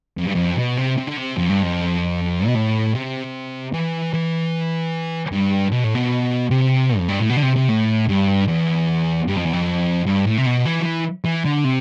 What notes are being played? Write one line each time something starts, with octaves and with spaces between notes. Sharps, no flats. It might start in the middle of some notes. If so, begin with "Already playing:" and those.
F2
G2
F2
B2
C3
C3
D3
C3
F2
G2
F2
B2
A2
C3
E3
E3
G2
B2
A2
B2
C3
F2
G2
A2
B2
D3
C3
C3
A2
G2
E2
G2
F2
E2
F2
G2
A2
C3
B2
E3
F3
E3
E3
D3
C3